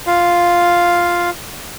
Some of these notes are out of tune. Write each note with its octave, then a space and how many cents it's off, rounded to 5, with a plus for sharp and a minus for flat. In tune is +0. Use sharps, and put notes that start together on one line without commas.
F4 +0 F5 +0